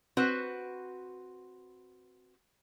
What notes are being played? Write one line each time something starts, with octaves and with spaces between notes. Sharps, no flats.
C4 F#4 B4